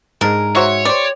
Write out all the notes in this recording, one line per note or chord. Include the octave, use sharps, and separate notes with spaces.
G#2 G#3 D4 A#4
F#4 C5 C#5 E5
G4 C5 D5